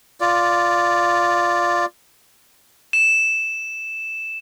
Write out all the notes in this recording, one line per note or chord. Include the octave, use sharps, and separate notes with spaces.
F4 D5
E7